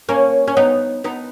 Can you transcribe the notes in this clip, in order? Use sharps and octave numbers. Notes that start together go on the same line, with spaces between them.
A#3 C#4
C#4
B3 D#4
B3 D#4